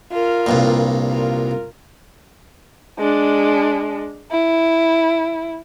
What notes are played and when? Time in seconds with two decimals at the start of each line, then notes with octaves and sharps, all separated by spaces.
0.12 F4 A#4
0.46 C2 G2 A#2
1.09 F4 A#4
2.99 G#3 D4
4.31 E4